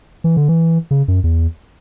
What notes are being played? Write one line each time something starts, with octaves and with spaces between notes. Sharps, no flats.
E3
D3
E3
C#3
F#2
E2